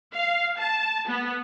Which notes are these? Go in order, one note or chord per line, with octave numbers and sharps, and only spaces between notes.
F5
A5
B3